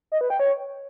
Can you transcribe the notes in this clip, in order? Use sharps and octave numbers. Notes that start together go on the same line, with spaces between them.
D#5
B4
G5
C#5